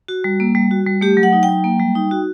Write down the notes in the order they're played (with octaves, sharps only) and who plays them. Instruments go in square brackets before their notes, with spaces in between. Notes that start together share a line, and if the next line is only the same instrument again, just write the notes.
[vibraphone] F#4
G3
A#3
G3
F#4
G3
A3 G4
F#3
F#5
D#4
G5
F#3
A#3
G3
D#4
F#4